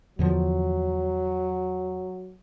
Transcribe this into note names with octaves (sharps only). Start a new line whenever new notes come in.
E2 D3 F3 F#3